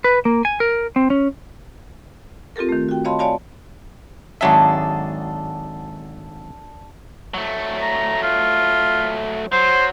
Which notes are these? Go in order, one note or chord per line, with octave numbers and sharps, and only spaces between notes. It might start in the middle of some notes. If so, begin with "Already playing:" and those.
B4
A#3
G#5
A#4
C4
C#4
C4 F4 G4 A4 A#4
D#3 A3
F#4 G5
C#5 D#5 F5 A5 B5 C6
C#5 D5 F5 G#5 A5 B5
G#1 F#3 D4 G#4 A4 E5
F#3 A3
A#5
F4
F#3 C5